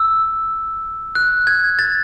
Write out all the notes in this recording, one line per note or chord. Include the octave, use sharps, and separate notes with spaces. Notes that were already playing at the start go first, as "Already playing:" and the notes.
Already playing: E6
F#6
G#6
A6